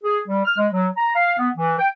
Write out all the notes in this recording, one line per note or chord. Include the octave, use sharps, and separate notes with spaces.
G#4
G3
F6
G#3
F#3
A#5
F5
B3
E3
G5